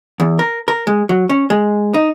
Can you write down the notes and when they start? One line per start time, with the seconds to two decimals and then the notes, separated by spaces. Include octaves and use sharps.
0.20 E2
0.39 A#4
0.68 A#4
0.87 G#3
1.09 F#3
1.29 C#4
1.50 G#3
1.94 D#4